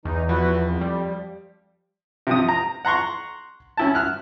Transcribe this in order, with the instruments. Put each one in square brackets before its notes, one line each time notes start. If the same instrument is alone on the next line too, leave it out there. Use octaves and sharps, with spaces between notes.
[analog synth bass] E2 [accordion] E3 D#4
[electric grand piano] F3 [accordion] E4 F#4 B4
[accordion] F2
[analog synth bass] G3
[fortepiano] C3 F3 D#6
A#5
F#5 A#5 C6 C#6
C#4 E4 A5
F6 F#6